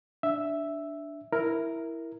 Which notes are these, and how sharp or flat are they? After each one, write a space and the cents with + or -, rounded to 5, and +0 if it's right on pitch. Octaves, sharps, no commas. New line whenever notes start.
D4 +0 E5 +0
E4 +0 A#4 +0